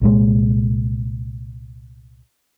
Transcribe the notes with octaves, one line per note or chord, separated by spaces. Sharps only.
C2 A#2 G#3